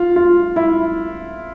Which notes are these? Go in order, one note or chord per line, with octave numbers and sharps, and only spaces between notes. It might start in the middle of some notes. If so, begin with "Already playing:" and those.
Already playing: F4
F4
E4